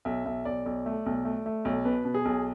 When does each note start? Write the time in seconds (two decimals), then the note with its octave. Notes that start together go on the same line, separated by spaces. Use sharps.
0.05 B1 E5
0.25 B1 E5
0.45 B1 D5
0.66 B1
0.86 A3
1.06 B1
1.25 A3
1.46 A3
1.65 B1
1.85 B2 B4
2.05 B2
2.14 G#4
2.25 B1